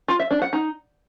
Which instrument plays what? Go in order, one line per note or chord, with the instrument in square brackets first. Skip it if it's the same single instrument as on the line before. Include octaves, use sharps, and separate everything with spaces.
[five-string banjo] F4
E5
D4
F#5
D#4